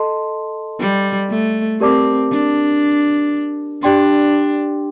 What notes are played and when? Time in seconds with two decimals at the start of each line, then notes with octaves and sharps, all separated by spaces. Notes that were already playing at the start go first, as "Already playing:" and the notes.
Already playing: A4 D#5 A5 C6
0.80 G3
1.30 A3
1.80 C4 G4 A#4 D5 A5 D6
2.31 D4
3.82 D4 G4 D5 G5 C6